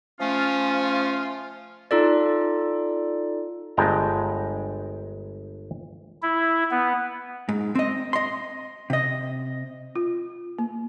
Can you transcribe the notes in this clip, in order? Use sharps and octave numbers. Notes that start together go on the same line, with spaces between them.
F3 A3 C#4 F4
D#4 F4 A4 D5
G1 G#3 B4 G5 A5 A#5
E4
B3
G#2
C4 D#5
D#5 C6
C3 D#5
F4
A#3